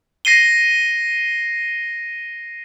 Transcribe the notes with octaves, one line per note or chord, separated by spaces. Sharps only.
A#6 C7 D#7 G7